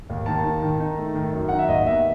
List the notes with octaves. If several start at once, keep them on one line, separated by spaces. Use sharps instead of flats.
D#2
D#3 A5
D#4
D#3
D#4
A3
D#3
F#2
D#4 F#5
E5
D#2 D#5
B3 E5